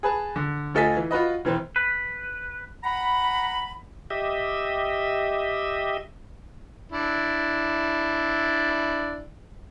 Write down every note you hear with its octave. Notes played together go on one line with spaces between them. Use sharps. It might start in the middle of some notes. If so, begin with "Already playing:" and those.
G#4 B4 A5
D3
D2 F4 A4 D#5 G#5 B6
E3
F4 F#4 B4 D#5
E1 E3 C4
B4
F#5 A#5 B5
G4 D#5 E5
D4 E4